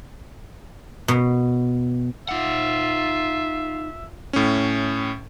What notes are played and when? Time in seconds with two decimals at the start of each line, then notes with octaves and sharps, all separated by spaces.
1.08 B2
2.29 D#4 F4 E5 F#5
4.33 A2 C#4